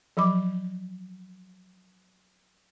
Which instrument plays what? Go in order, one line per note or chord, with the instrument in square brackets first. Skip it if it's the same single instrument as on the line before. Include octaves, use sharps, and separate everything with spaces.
[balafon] F3 F#3 B5 D6